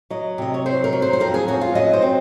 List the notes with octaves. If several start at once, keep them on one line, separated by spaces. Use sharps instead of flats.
F#3 D#5
C3 D#5
C#5
F#3 C5
A#4
F#3
C5
C5
F2 A#4
G#4
C#4 F#4
F4
F#3 D#5
C5
C4